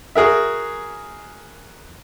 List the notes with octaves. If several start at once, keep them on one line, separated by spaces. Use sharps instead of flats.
F#4 G#4 A#4 E5